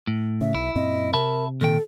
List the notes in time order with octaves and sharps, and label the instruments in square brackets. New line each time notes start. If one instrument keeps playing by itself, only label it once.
[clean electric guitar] A2
[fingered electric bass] C#3 [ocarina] E5
[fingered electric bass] B1 [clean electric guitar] E4
[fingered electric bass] F#2 A#2 C4 [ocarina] D#5
[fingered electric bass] C3 [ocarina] A#4 [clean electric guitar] E5 A5 B5
[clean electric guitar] A#2 D#3 G5 [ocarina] A4